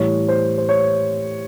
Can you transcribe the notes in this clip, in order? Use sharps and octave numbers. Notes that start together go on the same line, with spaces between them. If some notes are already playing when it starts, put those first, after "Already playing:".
Already playing: A2 E3 G3 C#5
C5
C5
C#5